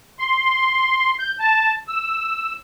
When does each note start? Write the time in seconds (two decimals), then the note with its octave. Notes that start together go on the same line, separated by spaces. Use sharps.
0.19 C6
1.19 G6
1.40 A5
1.88 E6